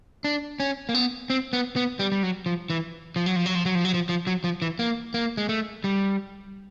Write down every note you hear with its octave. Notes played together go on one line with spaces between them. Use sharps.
D4
C#4
A#3
B3
C4
B3
B3
G3
G3
F#3
F3
E3
F3
F#3
F3
F#3
F3
F#3
F3
F#3
F3
F3
F#3
F3
E3
A#3
A#3
G#3
A3
G3